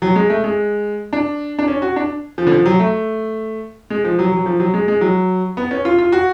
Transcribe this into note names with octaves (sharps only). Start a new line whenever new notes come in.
F#3
G#3
A3
G#3
D4
D4
C#4
F#4
D4
F3
D3
F3
F#3
A3
G#3
F3
F#3
F#3
F3
F#3
G#3
G#3
F#3
B3
C#4
F4
F4
F#4